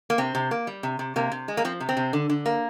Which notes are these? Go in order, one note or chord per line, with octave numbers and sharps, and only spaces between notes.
A#3
C3 C4
C3
A#3
G3
C3
C3
C3 A#3
C3
G#3
A#3
F3 C4
C3
C4
C3
D3
D3
A#3